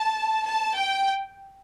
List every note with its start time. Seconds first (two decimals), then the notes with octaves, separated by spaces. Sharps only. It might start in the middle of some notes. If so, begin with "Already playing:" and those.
Already playing: A5
0.46 A5
0.76 G5